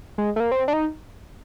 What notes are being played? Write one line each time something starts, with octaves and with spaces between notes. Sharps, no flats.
G#3
A3
A#3
C4
D4
D#4